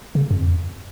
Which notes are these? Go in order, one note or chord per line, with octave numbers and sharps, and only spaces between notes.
C#3
F#2
F2